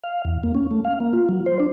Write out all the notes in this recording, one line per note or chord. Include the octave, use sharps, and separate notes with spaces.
F5
E2
A#3
C#4
A3
F5
A#3
F4
F#3
C5
D4